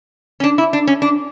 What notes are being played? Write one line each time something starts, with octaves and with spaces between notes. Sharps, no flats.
C#4
D4
E4
D4
C#4
D4